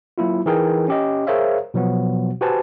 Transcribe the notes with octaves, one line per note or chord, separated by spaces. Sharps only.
F#3 A#3 E4 F4
E3 D#4 G#4 A#4 G5
C#4 G4 D#5
G#4 A#4 C5 C#5 E5 F5
B2 F3 F#3 B3 F#4
F#4 G4 B4 C5 G#5 A5